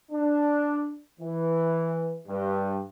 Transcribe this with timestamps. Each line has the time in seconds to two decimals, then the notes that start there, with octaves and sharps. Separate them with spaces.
0.12 D4
1.20 E3
2.27 G2